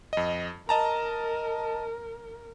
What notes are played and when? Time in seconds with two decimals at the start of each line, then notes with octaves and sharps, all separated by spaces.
0.13 F2 D#5
0.69 A#4 D#5 A5 A#5